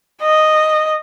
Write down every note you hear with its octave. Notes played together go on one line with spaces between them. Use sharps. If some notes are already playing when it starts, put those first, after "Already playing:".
D#5